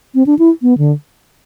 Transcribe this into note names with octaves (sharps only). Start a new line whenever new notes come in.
C4
D4
E4
B3
D3